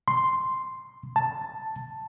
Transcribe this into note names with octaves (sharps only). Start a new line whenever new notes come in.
C6
A5